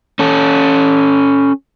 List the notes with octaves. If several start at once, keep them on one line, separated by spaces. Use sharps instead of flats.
C#4 A4